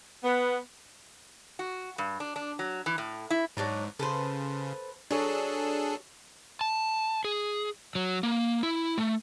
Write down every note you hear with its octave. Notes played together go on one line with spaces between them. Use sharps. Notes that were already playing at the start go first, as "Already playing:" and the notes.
B3
F#4
G2
D4
D4
F#3
E3
A2
E4
G#2 F#3 D4 A#5
C#3 A4 B4 C5
F#3 D4 G#4 A4
A5
G#4
F#3
A#3
E4
A3